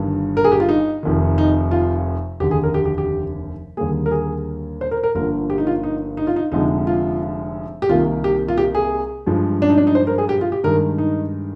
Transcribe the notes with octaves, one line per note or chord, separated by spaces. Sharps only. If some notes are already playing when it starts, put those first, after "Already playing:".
Already playing: G1 G2 D#3
A#4
G#4
G4
F4
D#4
F1 F2 D#3
D#4
F4
F1 D#2 D3 G4
G#4
A#4
G4
G4
G4
D#2 D3 G3 A#3 G#4
A#4
G#4
C5
A#4
A#4
G1 G2 D3 F3 A#3 A#4
G4
D#4
F4
D#4
D#4
F4
D#4
F1 F2 D3 G#3 D#4
F4
G4
C2 C3 D#3 A#3 F4
G4
F4
G4
G#4
G2 F3 G#3
D4
D#4
D4
D#4
C5
A#4
G#4
G4
F4
G4
G2 D#3 G#3 A#4
D#4